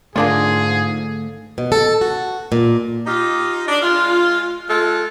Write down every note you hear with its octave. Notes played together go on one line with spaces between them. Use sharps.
G#2 D3 A3 A#3 D4 F4 G#4
B2
A4
F#4
A#2
D#4 F4 G4
D4
G#3 F4
G#3 F4 A4